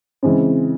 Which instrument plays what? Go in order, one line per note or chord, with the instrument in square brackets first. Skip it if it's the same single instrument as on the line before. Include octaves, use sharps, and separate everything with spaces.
[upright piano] C#3 E3 G#3 C4